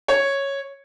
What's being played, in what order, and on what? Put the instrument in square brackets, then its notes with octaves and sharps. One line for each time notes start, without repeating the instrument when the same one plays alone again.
[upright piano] C#5